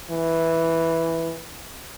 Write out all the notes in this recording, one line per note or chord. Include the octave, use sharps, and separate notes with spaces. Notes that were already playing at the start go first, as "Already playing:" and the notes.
E3